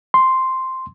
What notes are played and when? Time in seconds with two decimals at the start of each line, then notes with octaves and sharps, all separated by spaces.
0.14 C6